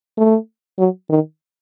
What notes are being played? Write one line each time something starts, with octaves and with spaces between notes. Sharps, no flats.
A3
F#3
D#3